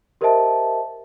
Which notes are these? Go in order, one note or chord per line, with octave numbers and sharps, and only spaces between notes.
G4 A#4 C5 D#5 E5 A5